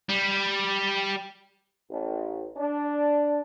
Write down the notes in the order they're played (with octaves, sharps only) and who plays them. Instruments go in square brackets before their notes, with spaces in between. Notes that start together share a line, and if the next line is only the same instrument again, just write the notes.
[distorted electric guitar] G3
[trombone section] A1
D4